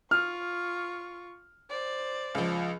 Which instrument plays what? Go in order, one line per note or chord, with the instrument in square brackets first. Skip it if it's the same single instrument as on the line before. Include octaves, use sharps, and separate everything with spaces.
[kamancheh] F4 C#6 [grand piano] F6
[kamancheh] C5 D5
[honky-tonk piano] C#2 F3